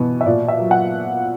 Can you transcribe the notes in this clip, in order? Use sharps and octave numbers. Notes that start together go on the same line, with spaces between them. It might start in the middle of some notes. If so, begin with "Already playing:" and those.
Already playing: B2 E3 B3
E5
A#2 D5
E5
F#3
F#5